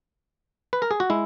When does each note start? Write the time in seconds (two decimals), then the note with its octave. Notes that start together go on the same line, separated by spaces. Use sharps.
0.73 B4
0.82 A#4
0.91 G#4
1.00 F#4
1.10 G#3 E4